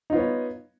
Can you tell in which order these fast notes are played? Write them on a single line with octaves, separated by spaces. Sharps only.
D#4 F4 B3 C#5